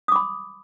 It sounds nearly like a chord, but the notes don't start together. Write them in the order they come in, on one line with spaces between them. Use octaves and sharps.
D#6 D6 B5